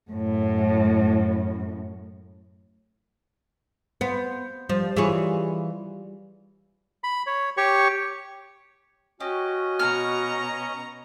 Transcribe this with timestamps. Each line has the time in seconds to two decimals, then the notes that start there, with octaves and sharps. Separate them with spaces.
0.11 F#2 A2
4.01 B3 C5
4.69 F3 G3
4.97 E3 G3 F4 G#4 C#5
7.04 B5
7.27 C#5
7.57 G4 C#5 C#6
9.20 C#4 F#4 G4 D#5
9.80 B2 A#5 C#6 F6